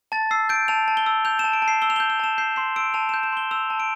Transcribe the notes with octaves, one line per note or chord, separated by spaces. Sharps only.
A5 A6
E6 C7
G6 D7
A5 F7
A5
G7
E6
G6 F7
A5 E7
D7
A5
C7
E6 G7
F7
G6 G7
F7
A5 E7
G6 C7
C6 C7
E6 D7
A5 F7
G6 E7
E7
C6 G7
E6 F7
A5
D7